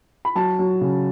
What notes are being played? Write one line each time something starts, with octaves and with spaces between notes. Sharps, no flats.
B5
F#3 A5
F#3
C#3